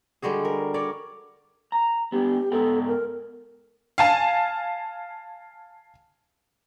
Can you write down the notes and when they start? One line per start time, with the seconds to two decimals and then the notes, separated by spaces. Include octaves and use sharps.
0.22 D3 G3 G#3 F#4 G#4
0.45 A#4
0.74 A#4 C#5 D5
1.72 A#5
2.12 B3 D4 G4
2.52 G#2 B3 A4 G5
2.88 A#4
3.98 F5 G#5 A5